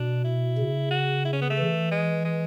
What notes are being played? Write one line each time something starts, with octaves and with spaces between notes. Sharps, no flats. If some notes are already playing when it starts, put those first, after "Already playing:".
Already playing: B2 D4
E4
C#3
F#4
E4
C#4
B3
A3
E3
G#3
G#3